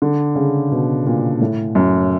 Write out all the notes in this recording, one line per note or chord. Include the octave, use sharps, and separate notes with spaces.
D3
C#3
B2
A#2
A2
F#2